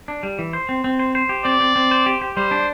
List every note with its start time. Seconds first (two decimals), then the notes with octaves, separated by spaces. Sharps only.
0.08 D4
0.23 G3
0.39 E3
0.53 C5
0.69 C4
0.84 C4
0.99 C5
1.15 C5
1.29 G4
1.45 C4 D5
1.60 C4
1.76 C4
1.91 C5
2.06 G4
2.21 G4
2.37 G3 C5
2.51 D4